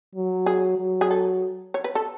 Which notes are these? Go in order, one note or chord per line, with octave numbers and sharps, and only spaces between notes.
F#3
G#4
F#3
G#4
A4
C#5
B4
A4